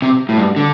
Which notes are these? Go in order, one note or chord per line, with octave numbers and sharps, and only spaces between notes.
C3
A2
G2
D3